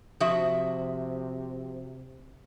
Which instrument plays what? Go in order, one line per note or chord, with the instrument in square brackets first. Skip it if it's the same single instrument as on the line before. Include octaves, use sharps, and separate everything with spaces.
[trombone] C3 [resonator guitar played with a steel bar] F3 F#4 E5